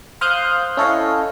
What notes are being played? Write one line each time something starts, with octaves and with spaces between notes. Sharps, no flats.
C5 F5 C6 D#6 F#6 G6
C#4 E4 A4 C#5 D#5 F5